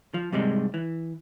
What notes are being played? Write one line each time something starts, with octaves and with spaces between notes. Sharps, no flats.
F3
G#2 C3 G3 G#3
E3